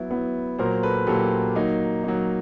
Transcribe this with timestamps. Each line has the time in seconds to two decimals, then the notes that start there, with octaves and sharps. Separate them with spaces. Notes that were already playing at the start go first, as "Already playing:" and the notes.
Already playing: F#3 B3 E4
0.10 F#3 B3 E4
0.58 A#2 F#3 A#3 A#4 C5
0.83 A4 B4
1.07 A#2 F#3 A#3 G4 A4
1.55 F#3 A#3 D#4
2.04 F#3 A#3 D#4